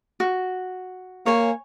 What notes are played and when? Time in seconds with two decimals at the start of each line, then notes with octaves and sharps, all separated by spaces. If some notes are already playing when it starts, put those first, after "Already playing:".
0.20 F#4
1.26 A#3 C#5 G#5